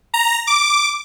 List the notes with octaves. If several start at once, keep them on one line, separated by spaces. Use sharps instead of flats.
A#5
D6